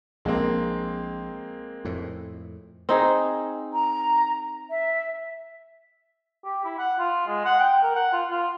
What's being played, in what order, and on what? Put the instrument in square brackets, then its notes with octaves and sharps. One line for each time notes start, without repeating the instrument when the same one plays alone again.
[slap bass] A#1 [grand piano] G#3 A#3 C4
[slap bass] F2 A2
[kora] C4 D#4 G#4
[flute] A#5
E5
[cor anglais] G4
E4
F#5
F4
G#3
F#5
G5
A#4
F#5
F4
F4